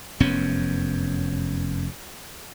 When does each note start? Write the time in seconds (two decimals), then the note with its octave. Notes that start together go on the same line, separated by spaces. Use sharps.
0.20 F1 F#2 B3 C#4